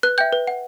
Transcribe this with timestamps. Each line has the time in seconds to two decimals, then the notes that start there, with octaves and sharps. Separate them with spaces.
0.03 B4 F#6
0.18 E5 G5 G6
0.33 B4
0.47 F#5